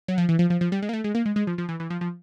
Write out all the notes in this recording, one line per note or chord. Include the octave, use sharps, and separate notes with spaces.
F#3
F3
E3
F3
F3
F3
G3
G#3
A#3
A3
G#3
A#3
G#3
G#3
F3
F3
E3
E3
F3
F3